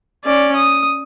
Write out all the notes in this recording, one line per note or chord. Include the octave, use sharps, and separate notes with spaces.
C#4 D5
D#6